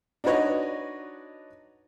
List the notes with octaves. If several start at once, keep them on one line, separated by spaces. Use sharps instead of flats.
D4 D#4 F#4 B4 C#5 D#5